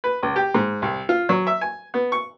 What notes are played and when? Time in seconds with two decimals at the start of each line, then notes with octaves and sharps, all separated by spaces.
0.04 B4
0.23 C#2
0.36 G4
0.54 G#2
0.82 C2
1.09 F4
1.29 F#3
1.47 E5
1.61 G#5
1.94 B3
2.12 C#6